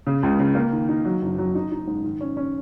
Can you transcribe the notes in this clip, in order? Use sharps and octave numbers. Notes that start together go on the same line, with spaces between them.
C#3
C#2
C#3
A#3
D#3
D#4
F#3
F#1
F#3
D#4
D#4
G#2
D#3
C#4
C#4